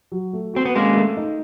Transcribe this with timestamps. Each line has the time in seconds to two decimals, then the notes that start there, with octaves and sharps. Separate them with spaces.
0.12 F#3
0.33 A3
0.54 C4 F#4
0.65 B3
0.75 G#3 A#3 C#4
0.96 A3
1.17 D#4